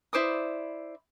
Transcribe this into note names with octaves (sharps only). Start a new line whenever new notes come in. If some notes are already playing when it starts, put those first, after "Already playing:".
E4 C5 D5 D#6